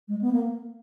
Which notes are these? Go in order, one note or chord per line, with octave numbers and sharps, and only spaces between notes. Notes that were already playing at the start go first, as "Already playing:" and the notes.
G#3
B3
A#3